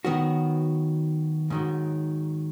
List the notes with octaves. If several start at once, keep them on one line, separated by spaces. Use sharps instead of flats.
D#3 F#3 B3 F#4
G#2 D#3 F#3